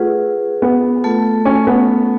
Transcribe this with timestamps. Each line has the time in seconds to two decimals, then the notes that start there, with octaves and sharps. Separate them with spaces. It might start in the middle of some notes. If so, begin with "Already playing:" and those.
Already playing: A3 F4 G#4 B4 F#5
0.62 B3
1.04 A3 F4 A4
1.45 C#4
1.67 B3